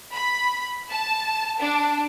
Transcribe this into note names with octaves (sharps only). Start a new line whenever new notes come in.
B5
A5
D4